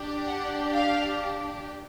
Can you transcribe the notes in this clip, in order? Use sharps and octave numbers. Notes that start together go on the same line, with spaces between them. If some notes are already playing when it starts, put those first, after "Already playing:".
Already playing: D4 G4
F#5
F5